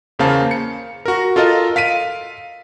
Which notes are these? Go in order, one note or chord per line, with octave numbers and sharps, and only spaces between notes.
E2 C#3 A#3 C5 F5 A5
C#7
F#4 A#4
F4 A4 A#4 D#5 F5
F5 B6 D7 D#7